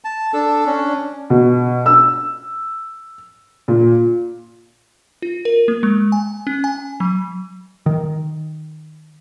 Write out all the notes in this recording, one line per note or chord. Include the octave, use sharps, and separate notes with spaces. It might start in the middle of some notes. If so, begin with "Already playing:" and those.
A5
D4 A4
C#4 D4
B2
E6
A#2
F4
A#4
A#3
G#3
G#5
C#4
G#5
F#3
D#3